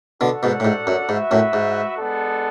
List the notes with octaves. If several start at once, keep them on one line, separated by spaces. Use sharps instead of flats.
B2 D3 D4 F#4 A4 D5 F#5
G#2 B2
A2
G#2
F#2
G#2 F#4 B4 E5
F#2 A2
G#2
G#3 B3 D4 A4